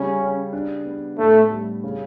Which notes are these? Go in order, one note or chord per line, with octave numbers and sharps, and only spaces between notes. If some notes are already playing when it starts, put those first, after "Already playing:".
Already playing: C#3 G3 C#4
G4
D4
B3
A2 A3
G3
C#3